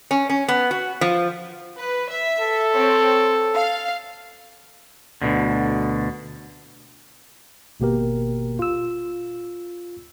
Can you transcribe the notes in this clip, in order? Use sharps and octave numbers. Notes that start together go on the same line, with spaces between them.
C#4
C#4
B3
F#4
F3
B4
E5
A4
C4 C#5
F5
D2 G2 B2 D3
G#1 B2 A#3 G4 A#4
F4 E6